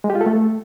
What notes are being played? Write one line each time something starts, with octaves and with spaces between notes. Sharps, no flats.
G#3
G4
F4
A4
A3